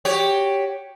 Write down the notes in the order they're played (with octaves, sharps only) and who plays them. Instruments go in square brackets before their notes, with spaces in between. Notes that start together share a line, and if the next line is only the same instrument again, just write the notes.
[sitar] F#4 G4 C#5